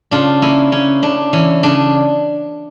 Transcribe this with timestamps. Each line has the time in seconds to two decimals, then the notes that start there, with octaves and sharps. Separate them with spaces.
0.11 C#3 D4 F4
0.42 A#3 C#4 E4
0.72 C#3 C#4
1.02 C#3 D4
1.33 E3 C#4
1.63 C#3 D4